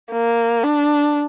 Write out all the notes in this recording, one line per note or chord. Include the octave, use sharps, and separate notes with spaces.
A#3
D4